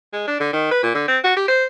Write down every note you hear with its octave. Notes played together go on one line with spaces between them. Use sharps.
G#3
D4
D3
D#3
B4
A#2
D3
C4
F#4
G4
C5